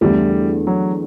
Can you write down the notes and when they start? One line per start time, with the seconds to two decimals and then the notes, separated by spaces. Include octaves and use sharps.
0.01 E2 D3 G3 A3 D4
0.67 F#3